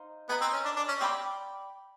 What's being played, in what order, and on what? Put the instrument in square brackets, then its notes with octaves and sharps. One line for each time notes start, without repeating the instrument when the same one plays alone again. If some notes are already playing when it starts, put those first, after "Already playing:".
Already playing: [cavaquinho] D#4 C5 F5
[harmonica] B3 [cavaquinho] A#4 D#5 G#5
[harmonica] C4
C#4
D4
D4
C#4
[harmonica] C4 [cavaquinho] D5 G5 B5 D6